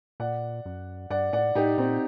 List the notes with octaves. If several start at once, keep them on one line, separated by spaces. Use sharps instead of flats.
A#2 D5 F#5
F#2
G2 D5 F#5
A2 D5 F#5
A2 D#4 G4
A#2 C4 D#4